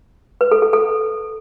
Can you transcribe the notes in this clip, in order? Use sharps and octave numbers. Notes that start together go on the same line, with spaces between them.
B4
A4
A4
A4